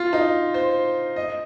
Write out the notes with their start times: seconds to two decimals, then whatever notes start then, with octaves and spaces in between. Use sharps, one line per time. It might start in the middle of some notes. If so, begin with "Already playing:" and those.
Already playing: F4
0.13 D#4
0.54 C5
1.16 D#5